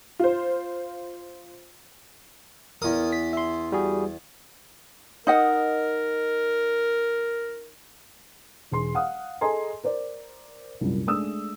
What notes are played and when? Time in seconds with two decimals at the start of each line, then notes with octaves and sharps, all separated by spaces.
0.19 F4 C5
2.82 E2 A#4 D#6
3.13 B6
3.33 E5 C6
3.72 G3 F#4 G#4
5.27 D#4 A#4 D#5 F#5
8.71 E1 G#4 C6
8.95 F5 F#5 D#6
9.41 G#4 A4 D#5 G#5 A#5 C6
9.84 A#4 C5 D5
10.81 C2 F#2 A#2 G3
11.07 G#3 A3 D4 D#6 E6